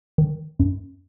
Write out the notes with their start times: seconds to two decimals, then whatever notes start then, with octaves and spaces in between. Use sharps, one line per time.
0.18 D#3
0.59 F#2